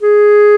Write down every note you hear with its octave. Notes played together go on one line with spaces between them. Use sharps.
G#4